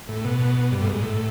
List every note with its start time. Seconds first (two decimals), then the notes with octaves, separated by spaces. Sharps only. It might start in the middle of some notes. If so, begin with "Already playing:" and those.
0.08 A2
0.25 B2
0.71 G2
0.81 A2
0.87 G#2
1.03 A2